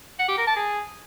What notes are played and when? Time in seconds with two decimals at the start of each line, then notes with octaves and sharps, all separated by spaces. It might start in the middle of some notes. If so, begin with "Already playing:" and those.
0.19 F#5
0.29 G4
0.38 A#4
0.47 A5
0.56 G#4